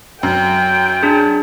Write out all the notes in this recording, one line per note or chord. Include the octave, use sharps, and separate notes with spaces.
F#2 G5
D4 G#4